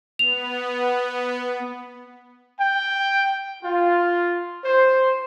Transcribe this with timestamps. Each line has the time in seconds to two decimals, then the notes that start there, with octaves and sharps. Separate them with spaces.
0.19 B3 F7
2.60 G5
3.64 F4
4.65 C5